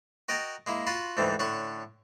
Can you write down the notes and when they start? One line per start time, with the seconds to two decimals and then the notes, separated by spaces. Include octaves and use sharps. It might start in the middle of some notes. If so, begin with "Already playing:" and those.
0.29 F#4 A#4 D#5 G5 A5 A#5
0.67 G#3 A#3 E4
0.87 F4 F#4 F#5 A5 B5 C6
1.17 D2 G#2 D3 E3 G3
1.39 A2 D3 C#4 F#5 C#6